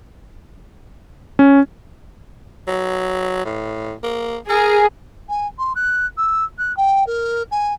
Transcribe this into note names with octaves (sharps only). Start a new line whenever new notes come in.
C#4
F#3
A2
A#3
G#4 A#4
G#5
C6
F#6
E6
F#6
G5
A#4
G#5